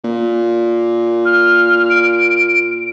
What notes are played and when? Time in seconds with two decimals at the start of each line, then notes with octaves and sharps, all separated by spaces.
0.04 A#2
1.25 F6
1.90 D7